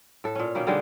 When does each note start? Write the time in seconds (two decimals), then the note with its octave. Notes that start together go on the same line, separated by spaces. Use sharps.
0.24 A2 A4
0.35 A#2 C#4
0.55 B2 D#3 A#3 C#4
0.67 D3 D#3 G3 G#3